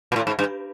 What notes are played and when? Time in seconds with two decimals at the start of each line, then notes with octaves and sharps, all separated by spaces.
0.12 A#2
0.16 A2
0.27 G#2
0.39 G2